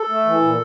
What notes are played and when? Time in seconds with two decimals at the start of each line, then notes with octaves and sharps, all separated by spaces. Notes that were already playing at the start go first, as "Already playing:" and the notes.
Already playing: A4
0.09 A3
0.26 E3
0.41 A#2